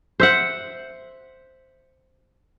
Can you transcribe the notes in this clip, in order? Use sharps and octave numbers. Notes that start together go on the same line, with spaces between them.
C5 E5 F#5